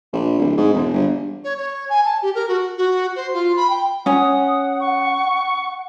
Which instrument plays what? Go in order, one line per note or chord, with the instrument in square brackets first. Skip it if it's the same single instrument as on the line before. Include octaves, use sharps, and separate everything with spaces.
[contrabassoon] A#1
D1
G#2
E1
G1
[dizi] C#5
C#5
G#5
A5
G4
A#4
F#4
F#4
C5
F4
B5
G5
[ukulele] C#4 G#5 [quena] F#5 [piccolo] D#6
[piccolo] C#6